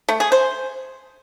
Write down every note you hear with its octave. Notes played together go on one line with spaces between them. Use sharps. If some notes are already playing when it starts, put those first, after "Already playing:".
A3
G#4
C5